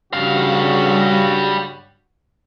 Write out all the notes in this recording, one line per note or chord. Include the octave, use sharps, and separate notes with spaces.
G2 C#3 G3 F#4 F5